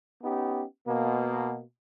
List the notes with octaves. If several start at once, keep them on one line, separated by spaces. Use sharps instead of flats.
B3 C#4 D#4 G4
B2 A#3